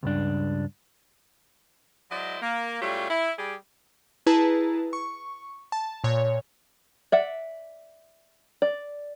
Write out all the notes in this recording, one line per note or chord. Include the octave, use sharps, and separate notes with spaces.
C#2 G2 D4
F#3 G#3 E4 C5 D5 D#5
A#3
F#2 F#3 G3 A3 F4 G4
E4
G3 G4 G#4
E4 G#4 B4 A5 A#5
C#6
A5
A#2 C#5
D5 E5 F#5
D5